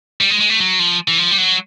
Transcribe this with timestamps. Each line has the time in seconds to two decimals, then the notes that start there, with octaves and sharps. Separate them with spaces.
0.21 G3
0.30 G#3
0.40 G#3
0.50 A3
0.60 F#3
0.79 F3
1.08 E3
1.18 F3
1.31 G3
1.38 F#3